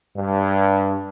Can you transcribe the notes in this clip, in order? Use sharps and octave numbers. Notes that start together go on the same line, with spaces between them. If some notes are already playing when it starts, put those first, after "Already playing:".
G2